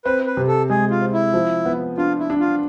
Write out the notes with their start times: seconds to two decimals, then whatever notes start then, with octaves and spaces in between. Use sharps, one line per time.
0.05 C4 B4
0.26 B4
0.37 C3
0.47 A4
0.70 G#3 G#4
0.90 F4
1.02 C4
1.13 E4
1.33 F3
1.66 B3
1.98 D4 F4
2.19 E4
2.30 D4
2.40 F4